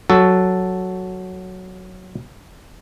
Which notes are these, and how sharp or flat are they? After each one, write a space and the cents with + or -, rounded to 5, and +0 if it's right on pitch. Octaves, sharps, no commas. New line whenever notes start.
F#3 +0 F#4 +0 A4 +0